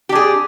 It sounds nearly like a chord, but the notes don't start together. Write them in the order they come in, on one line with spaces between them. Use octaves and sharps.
G4 D4 G#4